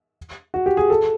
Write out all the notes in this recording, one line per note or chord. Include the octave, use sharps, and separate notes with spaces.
F#4
G4
G#4
A4